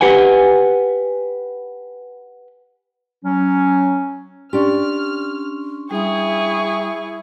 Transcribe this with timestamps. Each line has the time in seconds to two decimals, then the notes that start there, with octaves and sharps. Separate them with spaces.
0.01 G4 B4 F#5 G#5
3.25 F#3 C#4
4.53 C#4 D4 G4 C6 C#6 F6
5.91 G3 E4 G#4 C#6 D#6